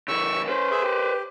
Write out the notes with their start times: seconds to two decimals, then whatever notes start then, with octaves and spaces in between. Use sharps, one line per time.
0.08 C#3 E3 C#6 E6
0.48 C#4 B4 C5
0.71 G#4 E5
0.83 G4